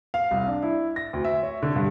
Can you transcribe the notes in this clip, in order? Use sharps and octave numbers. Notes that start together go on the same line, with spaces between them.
F5
C2
D4
E4
A#6
D2
E5
C#5
D3
G2